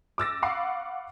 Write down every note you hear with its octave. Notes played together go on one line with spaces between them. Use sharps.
D6 E6 A6 A#6
F5 F#5 B5 C#6 D6 C7